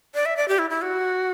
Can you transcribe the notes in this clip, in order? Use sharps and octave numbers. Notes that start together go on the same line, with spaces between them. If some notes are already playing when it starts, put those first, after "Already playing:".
D5
E5
D5
G4
E4
E4
F#4